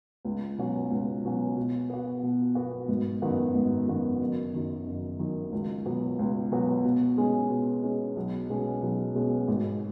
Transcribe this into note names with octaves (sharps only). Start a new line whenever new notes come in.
C#2
B2 F#3 C#4 F#4
C#2
B2 F#3 C#4 F#4
B2
B3 F#4
B2
B3 F#4
G#1
F#2 D#3 B3 F#4
G#1
F#2 D#3 B3 F#4
F#1
F#2 D#3
F#1
F#2 D#3
C#2
B2 F#3 B3 F#4
C#2
B2 F#3 B3 F#4
B2
G#3 C#4
B2
G#3 C#4
B1
B2 G#3 C#4
B1
B2 G#3 C#4
G#1